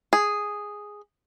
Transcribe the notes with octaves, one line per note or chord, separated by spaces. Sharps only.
G#4